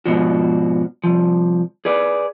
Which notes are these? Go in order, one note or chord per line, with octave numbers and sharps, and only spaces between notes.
G#2 B2 F3 D4 F#4
C2 F3
G#4 B4 D5